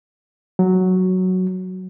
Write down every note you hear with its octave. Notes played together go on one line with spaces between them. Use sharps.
F#3